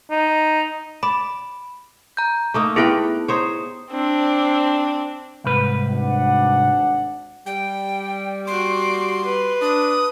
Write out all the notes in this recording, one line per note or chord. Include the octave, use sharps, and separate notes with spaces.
D#4
D5 B5
A#5 G6
A3 A#3 D#4
B3 E4 G4 G#4 B4 G5
D#4 C5 C#5
C4 D4
C2 G#2 B4
G#1 D4 F#5
G3 G5
F#4 C6 D6
B4
D4 D#6